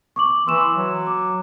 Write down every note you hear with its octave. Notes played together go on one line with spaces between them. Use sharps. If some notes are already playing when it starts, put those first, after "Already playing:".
C#6 D6 F#7
E3 C6 E6 E7
F#3
D6